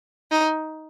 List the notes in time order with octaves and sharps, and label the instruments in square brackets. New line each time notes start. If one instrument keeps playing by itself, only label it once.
[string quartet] D#4